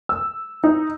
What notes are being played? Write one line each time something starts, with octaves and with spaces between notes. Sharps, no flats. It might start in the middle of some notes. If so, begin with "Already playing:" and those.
E6
D#4